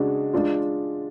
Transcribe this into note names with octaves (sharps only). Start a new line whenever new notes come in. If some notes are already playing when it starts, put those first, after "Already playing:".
Already playing: C#3 G#3 D4 F#4
G#3 D4 F4